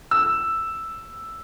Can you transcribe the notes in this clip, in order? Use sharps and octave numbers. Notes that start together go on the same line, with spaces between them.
E6